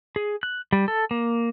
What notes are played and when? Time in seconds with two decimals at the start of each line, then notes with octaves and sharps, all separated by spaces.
0.16 G#4
0.43 F#6
0.73 G3
0.88 A4
1.11 A#3